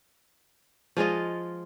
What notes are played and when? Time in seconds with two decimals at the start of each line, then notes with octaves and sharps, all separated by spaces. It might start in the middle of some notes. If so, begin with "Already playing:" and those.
0.97 F3 G#3 F4 D#5